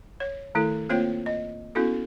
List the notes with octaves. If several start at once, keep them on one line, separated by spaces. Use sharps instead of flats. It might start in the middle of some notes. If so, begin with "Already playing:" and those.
C#5
D#3 A3 E4 A4
A#3 C4 F4 C5 C#5 G5
D#5
B3 C#4 E4 F#4 A4